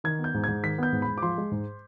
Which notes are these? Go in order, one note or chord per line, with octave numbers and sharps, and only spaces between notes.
D#3 G#6
B3
G6
G#2
G#6
G#2
D#3 B6
B3 G6
G#2
B5
G#2
D6
F3 C6
G#3
G#2